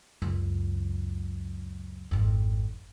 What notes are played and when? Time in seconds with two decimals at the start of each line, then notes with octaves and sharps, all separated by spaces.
0.22 C#2 F#2
2.11 G#1 F2